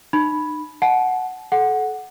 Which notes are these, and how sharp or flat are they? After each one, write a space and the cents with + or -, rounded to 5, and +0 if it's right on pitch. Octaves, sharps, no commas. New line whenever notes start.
D#4 -45 B5 +0
F#5 +0 A5 -35
A4 -30 F#5 +0